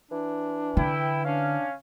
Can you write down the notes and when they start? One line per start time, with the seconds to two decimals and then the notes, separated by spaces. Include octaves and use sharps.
0.11 E3 D4
0.77 D3 E4 G5
1.24 C#4 D4 F5